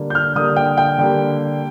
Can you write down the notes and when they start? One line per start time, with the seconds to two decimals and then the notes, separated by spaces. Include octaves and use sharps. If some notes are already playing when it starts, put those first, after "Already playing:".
Already playing: D3 G3 A#3
0.10 G6
0.15 F6
0.36 D3 G3 A#3 D#6
0.56 G5
0.78 G5
0.99 D3 G3 A#3